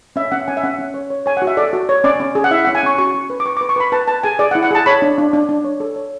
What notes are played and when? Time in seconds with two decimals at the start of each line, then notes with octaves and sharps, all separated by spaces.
0.16 C#4 E5
0.31 C#4 F#5
0.48 C#4 G#5
0.57 E5
0.63 C#4 F#5
0.78 C#4
0.94 C#5
1.10 C#5
1.26 C#5 G#5
1.37 F#4 F#5
1.47 E5
1.57 A4 D5
1.73 F#4
1.89 C#5
2.04 C#4 D5
2.20 C#4
2.35 G#4
2.44 F#5
2.51 E4 E5
2.65 C#4 F#5
2.75 G#5
2.83 C#4 C#6
2.98 F#4 C#6
3.14 F#4
3.30 B4
3.40 D6
3.46 B4 C#6
3.57 D6
3.61 B4
3.69 C#6
3.76 B4 B5
3.92 B4 A5
4.08 B4 A5
4.23 G#4 G#5
4.39 G#4 D5
4.51 F#5
4.55 E4
4.63 F#5
4.71 G#4 A5
4.86 C#5 B5
5.02 D4
5.18 D4
5.33 D4
5.49 D4
5.64 C#5
5.80 A4
5.96 C#5